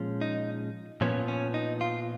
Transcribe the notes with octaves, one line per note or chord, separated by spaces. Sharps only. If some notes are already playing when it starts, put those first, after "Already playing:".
Already playing: A#2 F3 G#3 C#4
D#4
A#2 F3 B3 C#4
C#4
D#4
F4